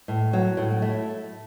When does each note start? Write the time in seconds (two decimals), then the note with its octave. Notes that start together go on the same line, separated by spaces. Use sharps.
0.08 A2
0.33 F#3
0.57 A2
0.82 A3